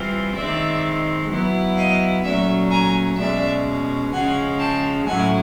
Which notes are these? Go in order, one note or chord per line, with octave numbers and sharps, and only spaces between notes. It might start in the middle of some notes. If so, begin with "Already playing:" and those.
Already playing: E3 G3 C4 F4
D#3 G#3 C4 D5 E5
F#3 B3 E4
D#5 F5
A#2 F#3 A3 C#4 D5 E5
G#5 A#5
B2 G#3 C#4 D5 E5
C#3 F3 G#3 C#4 F#5 G#5
G5 A5
A2 F#3 A3 C#4 E4 F#5 G#5